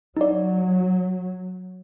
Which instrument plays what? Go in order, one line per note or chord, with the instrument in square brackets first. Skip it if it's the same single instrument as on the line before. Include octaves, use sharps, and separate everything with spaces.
[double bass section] F#3 [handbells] D#4 D5